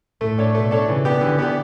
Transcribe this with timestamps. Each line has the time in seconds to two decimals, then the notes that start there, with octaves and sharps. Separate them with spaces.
0.20 A2 A3
0.38 D4 A4 C#5
0.54 B2 A3
0.71 D4 A4 C#5
0.88 C#3 E3
1.05 B3 D4 G4
1.21 D3 E3
1.39 B3 D4 G4